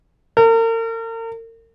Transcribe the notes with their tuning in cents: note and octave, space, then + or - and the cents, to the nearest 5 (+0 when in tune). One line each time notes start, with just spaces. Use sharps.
A#4 -40